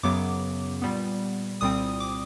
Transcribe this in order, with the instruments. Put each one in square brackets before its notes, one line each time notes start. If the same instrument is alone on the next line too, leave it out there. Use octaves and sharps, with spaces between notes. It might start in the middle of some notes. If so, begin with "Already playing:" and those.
[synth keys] F#2 C#3 F#3 B3 D6
A#2 G3 B3
C2 A#2 G3 C4 D#6
D6